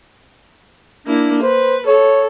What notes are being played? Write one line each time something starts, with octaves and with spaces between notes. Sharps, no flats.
A#3 D4 E4
B4 C5
A4 C#5